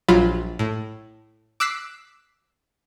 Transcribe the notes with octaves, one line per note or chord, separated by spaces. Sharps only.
A#1 F#3 F4 B5
A2
D6 E6 F#6 B6 C7